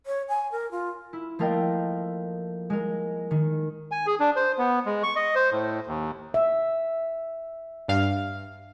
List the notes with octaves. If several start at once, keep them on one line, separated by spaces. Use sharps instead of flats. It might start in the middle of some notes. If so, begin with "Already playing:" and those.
C#5
G#5
A#4
F4
E4
F3 A3 A#3 A#4 D#5 G5
G#3 A#4
D#3
G#5
G#4
D4
C5
B3
G#3
C#6
D#5
C5
A2
D#2
E5
G2 F5